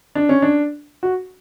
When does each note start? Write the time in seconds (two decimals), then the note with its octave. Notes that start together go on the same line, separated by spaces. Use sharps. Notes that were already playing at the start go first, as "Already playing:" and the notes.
0.15 D4
0.29 C#4
0.42 D4
1.03 F#4